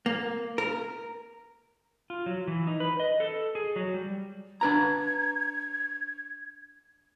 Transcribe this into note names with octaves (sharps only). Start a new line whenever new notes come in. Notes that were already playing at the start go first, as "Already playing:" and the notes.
A#3
A#4
F4
F#3
E3
D#4
B4
D#5
A4
G#4
F#3
G3
D4 B4 A#5 G#6